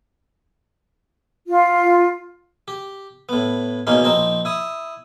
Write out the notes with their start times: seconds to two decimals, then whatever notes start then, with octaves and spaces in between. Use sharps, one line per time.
1.47 F4
2.68 G4
3.29 A2 B3
3.87 E2 B2 A#3 C#4 D#4
4.04 A#1 C4 D#4 A#5
4.45 E4 D#6